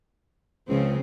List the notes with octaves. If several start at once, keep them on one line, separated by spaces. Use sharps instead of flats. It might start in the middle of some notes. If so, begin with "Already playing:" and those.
C#2 C#3 F3 C4